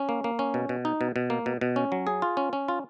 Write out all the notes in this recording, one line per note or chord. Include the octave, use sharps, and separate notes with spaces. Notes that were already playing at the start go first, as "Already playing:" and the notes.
Already playing: C#4
A#3
A#3
C#4
B2
B2
D#4
B2
B2
A#3
B2
B2
C#4
F#3
G#4
F4
C#4
C#4
F4